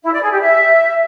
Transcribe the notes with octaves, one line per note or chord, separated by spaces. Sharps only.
E4
D5
G#4
G4
E5